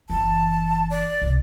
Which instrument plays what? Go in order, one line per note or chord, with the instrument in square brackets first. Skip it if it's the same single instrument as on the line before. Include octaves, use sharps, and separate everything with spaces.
[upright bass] F#1 E3 [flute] A5
[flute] D5
[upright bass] C2 B2